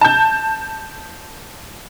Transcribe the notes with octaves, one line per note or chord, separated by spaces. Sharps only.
A5 G6